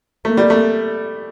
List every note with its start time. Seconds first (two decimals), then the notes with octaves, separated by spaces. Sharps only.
0.25 A3 A#3
0.37 G3
0.50 A3